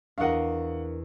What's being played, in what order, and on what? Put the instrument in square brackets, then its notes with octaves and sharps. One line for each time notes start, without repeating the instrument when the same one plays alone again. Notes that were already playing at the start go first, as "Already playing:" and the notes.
[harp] E2 C#6 [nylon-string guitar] D4 A#4 D#5 [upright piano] F5 F#5